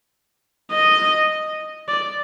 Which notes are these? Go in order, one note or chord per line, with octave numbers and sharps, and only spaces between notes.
D#5
D5